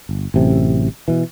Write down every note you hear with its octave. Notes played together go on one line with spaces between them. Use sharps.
G1
A1 F#2 C3
B2 E3